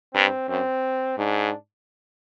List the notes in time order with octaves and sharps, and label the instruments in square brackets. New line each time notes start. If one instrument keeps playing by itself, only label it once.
[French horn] G2 [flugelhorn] C4
[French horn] F#2 [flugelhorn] C4
[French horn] G#2 [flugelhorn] D4